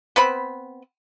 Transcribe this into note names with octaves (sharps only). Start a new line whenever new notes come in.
B3 C4 B5